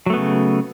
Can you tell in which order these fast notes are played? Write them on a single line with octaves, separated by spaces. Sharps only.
F#3 A3 B3 C#3